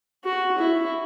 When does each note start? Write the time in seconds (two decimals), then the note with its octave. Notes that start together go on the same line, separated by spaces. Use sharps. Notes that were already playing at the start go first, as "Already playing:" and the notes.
0.24 F#4
0.58 E4